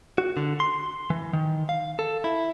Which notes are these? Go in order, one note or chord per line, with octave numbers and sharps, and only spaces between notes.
F#4
D3
C6
E3
D#3
F5
A4
E4